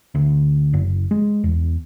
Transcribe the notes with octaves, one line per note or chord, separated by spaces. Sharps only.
D2
F#1
G#3
E2